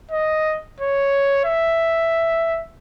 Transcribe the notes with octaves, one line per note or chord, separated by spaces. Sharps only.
D#5
C#5
E5